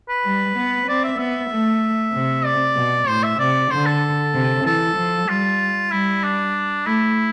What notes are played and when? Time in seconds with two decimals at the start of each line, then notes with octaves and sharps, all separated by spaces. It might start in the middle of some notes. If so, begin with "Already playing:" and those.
0.09 B4
0.24 G3
0.56 B3
0.87 C4 D5
1.04 E5
1.19 B3 E5
1.51 A3
2.13 C3
2.45 D5
2.76 B2
3.08 A2 C5
3.23 E5
3.39 C3 D5
3.71 D3 C5
3.86 A4
4.34 C3
4.65 E3 A4
4.96 F3
5.28 G3 F4
5.91 G3 E4
6.23 D4
6.86 A3 E4